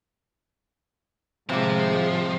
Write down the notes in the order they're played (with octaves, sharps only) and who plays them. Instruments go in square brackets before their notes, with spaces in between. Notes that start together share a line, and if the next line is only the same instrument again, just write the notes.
[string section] A2 D#3 G#3 [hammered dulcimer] C3 D6 [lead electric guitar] F3